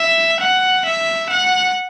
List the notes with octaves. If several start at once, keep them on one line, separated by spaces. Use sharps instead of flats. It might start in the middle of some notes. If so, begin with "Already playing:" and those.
Already playing: E5
F#5
E5
F#5